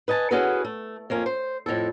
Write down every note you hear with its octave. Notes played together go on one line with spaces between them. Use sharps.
B4 D#5 G#5 A5
C#4 E4 F#4 G#4 A4 B4
A3
F2 A#3 C#4
C5
F2 A2 E4 A4